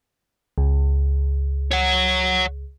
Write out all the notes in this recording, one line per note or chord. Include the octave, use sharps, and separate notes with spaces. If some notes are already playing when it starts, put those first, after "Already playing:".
C#2
C#5 F#5